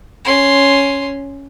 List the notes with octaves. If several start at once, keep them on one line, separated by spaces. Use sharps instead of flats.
C#4 C6